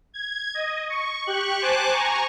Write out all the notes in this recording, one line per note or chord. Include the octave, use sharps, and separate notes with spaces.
G#6
D#5
C#6
G4 C#6 F#6
C5 G#5 A5 D6 F#6
G#5 A#5 C#6